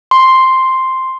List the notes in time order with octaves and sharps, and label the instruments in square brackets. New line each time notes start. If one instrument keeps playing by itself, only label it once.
[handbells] C6